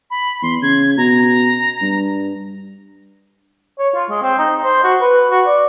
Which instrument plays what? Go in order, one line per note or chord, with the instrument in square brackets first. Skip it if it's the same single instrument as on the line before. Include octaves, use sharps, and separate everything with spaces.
[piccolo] B5
[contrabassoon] E2 [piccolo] C6
[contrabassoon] C#3 [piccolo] G#6
[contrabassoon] B2 [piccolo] A#5
[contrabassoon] G2
[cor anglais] C#5
F4
G#3
C4
D#4
C5
F#4
B4
F#4
D5